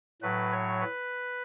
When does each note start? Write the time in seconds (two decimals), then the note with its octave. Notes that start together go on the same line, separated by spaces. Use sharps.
0.22 A2 F#3 B4
0.52 C#5
0.81 B4